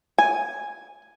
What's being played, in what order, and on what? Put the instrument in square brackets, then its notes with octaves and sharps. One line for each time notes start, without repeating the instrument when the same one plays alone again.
[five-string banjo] G#5